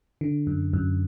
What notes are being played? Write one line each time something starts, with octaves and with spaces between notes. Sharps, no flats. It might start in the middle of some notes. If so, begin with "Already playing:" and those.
D3
F#2
F#2